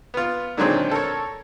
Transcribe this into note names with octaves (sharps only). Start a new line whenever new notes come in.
B3 F4
A#2 D3 D#3 F#3 G#3 C4
A4 A#4 C#5